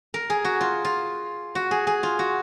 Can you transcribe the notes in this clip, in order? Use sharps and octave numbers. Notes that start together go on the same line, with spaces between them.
A#4
G#4
F#4
F4
F4
F#4
G#4
G#4
F4
F#4